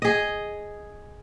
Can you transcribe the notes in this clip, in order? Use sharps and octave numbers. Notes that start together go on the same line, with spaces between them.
G#4 D#5